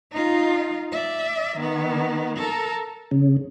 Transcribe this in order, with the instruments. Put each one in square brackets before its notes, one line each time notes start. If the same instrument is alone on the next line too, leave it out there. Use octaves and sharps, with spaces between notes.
[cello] D#4 F4
D5 E5
D#3 B3
A4 A#4
[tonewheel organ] C#3